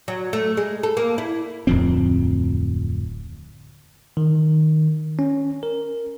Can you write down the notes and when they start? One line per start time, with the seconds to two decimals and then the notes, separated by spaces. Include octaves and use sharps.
0.08 F#3
0.33 A3
0.57 G#3
0.83 A4
0.97 A#3
1.18 E4
1.67 D1 F2 C4
4.17 D#3
5.19 C#4
5.63 A#4